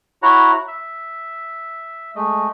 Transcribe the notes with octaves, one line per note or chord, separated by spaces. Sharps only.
E4 F#4 C#5 F#5 A#5
E5
G#3 A3 D#5